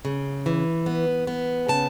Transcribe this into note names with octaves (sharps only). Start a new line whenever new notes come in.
C#3
E3
B3
B3
C#3 A5